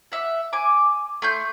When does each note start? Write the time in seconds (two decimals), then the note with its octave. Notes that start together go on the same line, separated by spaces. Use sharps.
0.12 E5 F#5
0.53 G#5 D6
1.22 A3 C6 G6